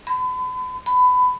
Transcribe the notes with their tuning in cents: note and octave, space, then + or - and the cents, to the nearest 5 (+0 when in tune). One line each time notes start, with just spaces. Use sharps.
B5 +40
B5 +20